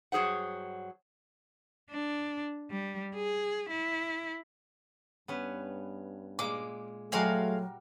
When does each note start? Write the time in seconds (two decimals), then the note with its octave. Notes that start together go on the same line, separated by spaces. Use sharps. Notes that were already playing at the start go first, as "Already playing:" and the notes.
0.12 G2 F#3 G#4 C5 F#5
1.90 D4
2.70 G3
3.15 G#4
3.70 E4
5.28 G2 B3 C#4 B4
6.39 A#2 G#3 A#3 D6
7.12 F#3 G3 A3 F#4 G#4 A#4 F5 C6